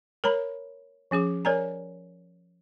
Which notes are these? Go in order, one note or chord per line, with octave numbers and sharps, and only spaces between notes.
A#4 C#5 A#5 B5
F3 C#4 G#4 D6
A#4 C#5 D5 G#5 A#5